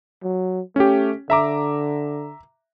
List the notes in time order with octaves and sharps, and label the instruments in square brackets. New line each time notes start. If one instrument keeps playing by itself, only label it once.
[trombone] F#3
[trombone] A3 [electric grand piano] C#4 G4
[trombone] D3 [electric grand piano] E5 A#5 D6